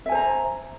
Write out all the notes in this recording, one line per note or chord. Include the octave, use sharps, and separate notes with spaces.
C5 E5 G#5 A#5